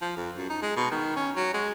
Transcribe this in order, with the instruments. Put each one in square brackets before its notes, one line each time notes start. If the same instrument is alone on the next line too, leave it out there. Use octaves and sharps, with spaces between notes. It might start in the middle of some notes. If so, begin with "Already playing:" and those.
[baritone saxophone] F3
F2
F#2
D#4
G#3
B2
D#3
C#4
F#3
G#3